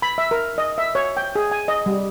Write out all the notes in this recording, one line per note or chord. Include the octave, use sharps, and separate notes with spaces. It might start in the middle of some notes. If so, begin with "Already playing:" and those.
B5
E5
A#4
D#5
E5
C#5
G5
G#4
G#5
D#5
G3